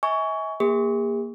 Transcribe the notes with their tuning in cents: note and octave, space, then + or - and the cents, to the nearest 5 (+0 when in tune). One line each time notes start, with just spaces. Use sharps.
E5 -45 G#5 +0 C#6 +20
A#3 +10 G#4 -40